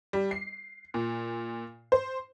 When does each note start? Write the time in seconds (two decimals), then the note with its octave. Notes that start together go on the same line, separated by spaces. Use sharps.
0.13 G3
0.31 C7
0.94 A#2
1.92 C5